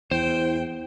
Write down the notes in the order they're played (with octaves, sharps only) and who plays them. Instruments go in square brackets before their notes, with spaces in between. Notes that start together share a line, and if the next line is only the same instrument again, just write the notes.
[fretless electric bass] E2 [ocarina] E4 [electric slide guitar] C5 [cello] G5